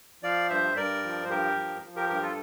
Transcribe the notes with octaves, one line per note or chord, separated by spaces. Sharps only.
F3 D5 F5
G2 C5 E5
G2 A#4 D5
F3
C5
G2 G4 A#4
F3
F3
G4 A#4
G2 G4 A#4
F4 A4